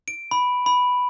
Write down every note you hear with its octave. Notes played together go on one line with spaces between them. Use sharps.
D7
B5
B5